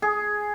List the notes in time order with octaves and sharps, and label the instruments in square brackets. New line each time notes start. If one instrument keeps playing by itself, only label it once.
[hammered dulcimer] G#4